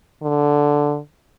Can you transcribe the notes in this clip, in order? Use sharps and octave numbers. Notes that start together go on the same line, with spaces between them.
D3